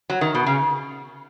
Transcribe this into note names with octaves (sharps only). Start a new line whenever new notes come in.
F#3
D#3
B2
C#3